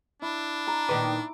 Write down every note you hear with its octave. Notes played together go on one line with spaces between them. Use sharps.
D4 E4
A#5
A#2 D#3 B4 D6